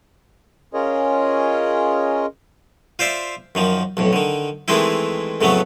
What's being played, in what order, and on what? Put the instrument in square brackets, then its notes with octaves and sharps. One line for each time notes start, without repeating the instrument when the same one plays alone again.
[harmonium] C#4 F4 G#4 A#4 C#5 D#5
[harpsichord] F4 C5 D5 E5
F#2 D#3 F3
B1 F2 A2
D3 D#3
D#3 E3 G#3 A3 C4 E4
F2 A2 C#3 F#3 A3 B3